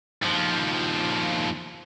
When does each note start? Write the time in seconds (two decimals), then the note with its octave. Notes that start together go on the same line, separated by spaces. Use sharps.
0.23 D#2 F3